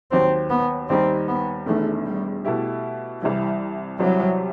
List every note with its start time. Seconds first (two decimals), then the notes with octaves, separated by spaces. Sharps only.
0.11 D#2 D#3 F#3 C4
0.50 B3
0.89 D#2 D#3 G3 C4 D#4
1.28 B3
1.66 E1 E2 D#3 A3
2.06 G3
2.45 B2 A3 E4 G4
3.21 C2 C3 E3 G3
3.99 C2 C3 E3 F#3 G3